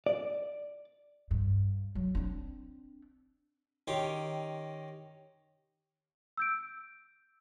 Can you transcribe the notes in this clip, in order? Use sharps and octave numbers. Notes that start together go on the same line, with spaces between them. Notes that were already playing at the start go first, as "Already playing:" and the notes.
D5
G2
F#3
C4 D4
D#3 C#4 D#4 G4 C6
E6 G6 D7